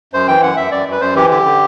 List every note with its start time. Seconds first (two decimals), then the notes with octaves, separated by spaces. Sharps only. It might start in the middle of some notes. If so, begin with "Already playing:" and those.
0.13 F#2 C5
0.28 E3 G5
0.42 F#2 F#5
0.57 F#2 E5
0.71 F#2 D5
0.87 F#2
0.92 B4
1.01 F#2 C5
1.15 E3 G4
1.30 D3 G4
1.45 D3